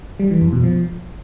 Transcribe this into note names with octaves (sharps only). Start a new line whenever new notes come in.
G3
E3
F2
B2
F3